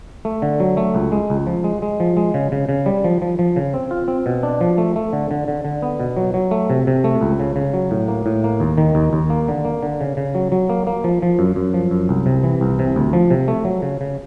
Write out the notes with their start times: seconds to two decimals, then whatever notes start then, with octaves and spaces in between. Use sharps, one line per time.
0.25 A3
0.42 D3
0.60 F#3
0.77 A3
0.95 C#2
1.12 G#3
1.30 C#2
1.47 F3
1.64 G#3
1.82 G#3
2.00 F3
2.17 G#3
2.34 C#3
2.52 C#3
2.69 C#3
2.86 G3
3.04 F3
3.22 F3
3.39 F3
3.56 C#3
3.74 C4
3.91 F4
4.08 C4
4.26 B2
4.43 D4
4.61 F3
4.78 A3
4.96 A3
5.13 D3
5.31 D3
5.48 D3
5.65 D3
5.82 B3
6.00 B2
6.17 F#3
6.34 F#3
6.51 A3
6.70 C3
6.87 C3
7.04 A3
7.21 C#2
7.40 C#3
7.56 C#3
7.74 F#3
7.91 A2
8.08 A#3
8.26 A2
8.44 A#3
8.60 D#2
8.78 D#3
8.95 D#2
9.13 D#2
9.30 A#3
9.48 D3
9.65 A#3
9.83 D3
10.01 C#3
10.17 C#3
10.35 F#3
10.52 F#3
10.69 A#3
10.87 A#3
11.04 F3
11.22 F3
11.39 F#2
11.56 F#2
11.74 F3
11.91 F#2
12.09 C2
12.26 C3
12.44 E3
12.61 C2
12.79 C3
12.96 D2
13.13 F3
13.30 C3
13.48 A3
13.65 F#3
13.82 C#3
14.01 C#3